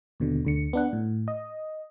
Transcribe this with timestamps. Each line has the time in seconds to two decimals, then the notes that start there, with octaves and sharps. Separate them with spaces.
0.20 D#2 B2 D3
0.45 D2 D3 C#7
0.73 B3 D4 F#5
0.93 A2
1.28 D#5